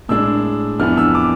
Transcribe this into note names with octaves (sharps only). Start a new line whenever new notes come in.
A2 G#3 D4 E6
F2 E3 B3 D4 F6
E6
D6